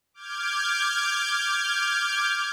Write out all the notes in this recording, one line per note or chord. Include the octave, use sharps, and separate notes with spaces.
D6 F6 G6 G#6